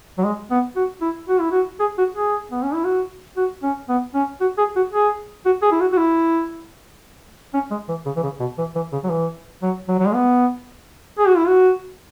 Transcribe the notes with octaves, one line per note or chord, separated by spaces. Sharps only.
F#3
G#3
B3
F#4
E4
F#4
E4
F#4
G#4
F#4
G#4
B3
C#4
E4
F#4
F#4
C#4
B3
C#4
F#4
G#4
F#4
G#4
F#4
G#4
E4
F#4
F#4
E4
C#4
G#3
E3
C#3
E3
C#3
B2
E3
E3
C#3
F#3
E3
F#3
F#3
F#3
G#3
B3
G#4
F#4
E4
F#4